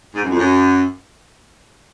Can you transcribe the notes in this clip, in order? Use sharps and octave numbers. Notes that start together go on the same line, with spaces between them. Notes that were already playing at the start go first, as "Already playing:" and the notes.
G#2
F#2
F2
F#2